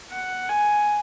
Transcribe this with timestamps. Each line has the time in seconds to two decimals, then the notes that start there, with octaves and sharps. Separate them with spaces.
0.12 F#5
0.49 G#5